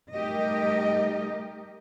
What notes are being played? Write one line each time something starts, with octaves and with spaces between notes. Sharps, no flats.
G3 A3 D#4 G4 A#4 D#5